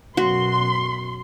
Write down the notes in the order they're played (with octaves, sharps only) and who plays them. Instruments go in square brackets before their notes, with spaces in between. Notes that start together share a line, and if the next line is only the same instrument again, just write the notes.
[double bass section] F#2 B2 [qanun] F#4 [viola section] C6